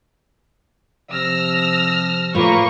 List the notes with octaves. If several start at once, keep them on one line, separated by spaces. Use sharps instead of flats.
C3 F3 E6 F6 A#6
A2 A3 A#3 F4 B4 C#6